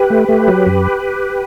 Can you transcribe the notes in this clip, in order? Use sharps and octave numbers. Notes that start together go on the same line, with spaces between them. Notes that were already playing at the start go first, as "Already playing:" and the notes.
Already playing: G4 B4
A3
A3
F#3
F#2